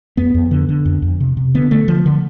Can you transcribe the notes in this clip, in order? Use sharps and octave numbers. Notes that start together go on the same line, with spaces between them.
F2 B3
F2
D3
D3
F2
F2
C3
C3
D3 B3
D3 A3
D3 F3
D3